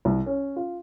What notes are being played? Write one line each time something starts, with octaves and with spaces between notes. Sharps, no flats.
C2
C#4
F4